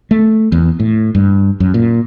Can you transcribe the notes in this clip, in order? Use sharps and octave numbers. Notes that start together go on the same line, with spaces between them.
A3
E2
A2
G2
F#2
A#2